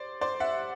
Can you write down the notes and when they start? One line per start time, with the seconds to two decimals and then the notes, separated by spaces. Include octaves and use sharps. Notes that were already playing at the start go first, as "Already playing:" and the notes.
Already playing: C5 D5
0.21 C5 D5
0.40 E5 F#5